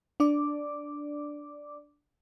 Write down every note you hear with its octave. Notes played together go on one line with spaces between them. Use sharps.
D4 D5 D6